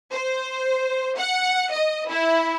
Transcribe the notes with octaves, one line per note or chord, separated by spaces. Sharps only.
C5
F#5
D#5
E4